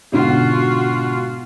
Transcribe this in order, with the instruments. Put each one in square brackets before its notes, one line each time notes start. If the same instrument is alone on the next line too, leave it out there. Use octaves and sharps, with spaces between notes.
[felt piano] G#2 B2 D3 [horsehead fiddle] F4 F#4